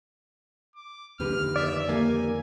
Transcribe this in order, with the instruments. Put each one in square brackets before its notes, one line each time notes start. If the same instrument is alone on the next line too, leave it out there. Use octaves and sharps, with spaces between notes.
[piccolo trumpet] D6
[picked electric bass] F2 D3 D#3 [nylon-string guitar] D#4 G4 B4 [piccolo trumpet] F6
[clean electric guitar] D5 [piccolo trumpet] E5
[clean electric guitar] A#3 [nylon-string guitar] D#4 G4 [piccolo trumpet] G#5